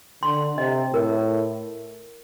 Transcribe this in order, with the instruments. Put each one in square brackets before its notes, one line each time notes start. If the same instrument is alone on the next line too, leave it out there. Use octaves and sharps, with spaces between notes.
[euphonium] D3 [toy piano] C6
[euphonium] C3 [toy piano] D#5
[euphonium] A2 [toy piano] A#4